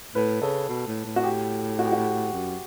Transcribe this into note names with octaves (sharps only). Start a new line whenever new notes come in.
A2 B4
C#3 A4
B2
A2
A2
F#4
G4
F#4
G4
F#4
F#2